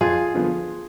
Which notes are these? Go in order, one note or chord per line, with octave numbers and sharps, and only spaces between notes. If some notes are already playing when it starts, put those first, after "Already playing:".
F2 F4 G#4
D3 F3 B3